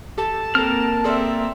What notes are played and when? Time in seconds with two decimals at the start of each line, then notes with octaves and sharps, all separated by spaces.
0.17 G4 A4 A5
0.55 A#3 C4 A4 A#4 F6
1.04 C4 G#4 A4 D5 E5